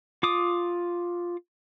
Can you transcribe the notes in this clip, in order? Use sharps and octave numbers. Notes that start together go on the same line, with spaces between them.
F4 D6 D#6